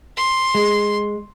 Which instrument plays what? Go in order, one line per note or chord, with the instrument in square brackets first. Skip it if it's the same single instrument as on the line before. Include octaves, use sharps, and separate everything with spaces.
[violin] C6
[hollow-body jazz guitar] G#3